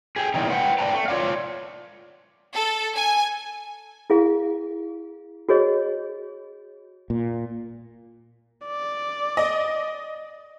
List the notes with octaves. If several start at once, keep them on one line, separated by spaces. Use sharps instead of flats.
G4 G#4
E2 A#2 D#3 E3 G3 D#4
B4 F#5 G5
B4 D5 G5 A5 A#5
A3
F4 C#5 D5 F5
A4
G#5
E4 G#4 F5
F#4 G#4 C#5 D#5
A#2
D5
D#5